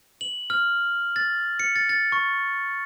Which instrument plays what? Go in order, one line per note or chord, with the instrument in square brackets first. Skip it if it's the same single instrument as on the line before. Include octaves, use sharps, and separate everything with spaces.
[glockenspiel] F#7
F6
A6
C#7
A6
A6
C#6